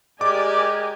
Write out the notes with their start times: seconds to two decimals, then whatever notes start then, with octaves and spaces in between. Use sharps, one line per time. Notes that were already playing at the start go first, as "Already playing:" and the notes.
0.21 G#3 G4 A#4 D5 G#5 D6